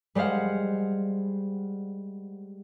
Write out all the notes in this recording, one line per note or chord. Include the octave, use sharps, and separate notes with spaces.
G3 G#3 C5 F5 F#5